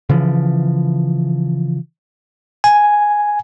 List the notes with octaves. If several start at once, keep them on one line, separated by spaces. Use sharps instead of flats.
C#3 E3 F3
G#5